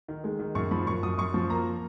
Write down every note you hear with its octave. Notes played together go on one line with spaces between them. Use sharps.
D#3
G#3
D#3
F#2 C#6
F3 B5
F#2 C#6
F#2 D#6
F#2 C#6
F3
A#3 A#5